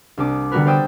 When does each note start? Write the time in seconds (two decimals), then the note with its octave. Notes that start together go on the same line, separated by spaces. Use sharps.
0.17 C2 D4 D6 D#6
0.51 D3 G3 B3 F#4 A#4 B4
0.65 A#4 C5 D5 G5 D#6 E6